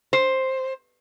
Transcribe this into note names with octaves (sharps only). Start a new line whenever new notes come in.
C5